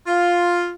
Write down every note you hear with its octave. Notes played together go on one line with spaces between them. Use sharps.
F4